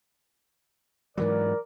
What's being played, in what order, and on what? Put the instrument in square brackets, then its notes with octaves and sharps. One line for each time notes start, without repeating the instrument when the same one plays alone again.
[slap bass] G#2 E3 F#3 [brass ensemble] A#4 D5